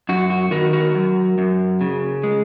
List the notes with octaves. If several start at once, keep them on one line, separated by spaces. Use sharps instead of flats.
F#2 F#4
F#4
D#3 F#4 A#4
F#4 A#4
F#3
F#2
C#3
G#3